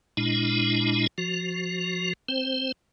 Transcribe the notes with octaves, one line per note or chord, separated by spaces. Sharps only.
A#2 G#3 D4 E4
F3 F#4
C4 C5